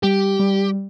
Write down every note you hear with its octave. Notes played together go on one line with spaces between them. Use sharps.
G3 G4
G3